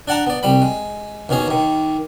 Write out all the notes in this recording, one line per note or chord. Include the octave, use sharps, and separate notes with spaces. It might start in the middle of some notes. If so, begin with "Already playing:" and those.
D4 D5 F#5 A5 A#5
B3 D5
C2 G3 B5
G#3
D#2 B2 C#4 G#4
D#2 D#3